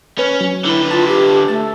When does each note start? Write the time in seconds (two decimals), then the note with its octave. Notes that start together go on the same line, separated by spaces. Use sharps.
0.19 C#4 B4
0.41 F#3
0.64 D3 E4 B4
0.91 F4 A5
1.08 G4
1.48 A3 A5